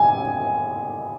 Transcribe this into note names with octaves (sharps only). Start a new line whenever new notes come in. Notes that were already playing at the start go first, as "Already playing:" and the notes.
Already playing: G#5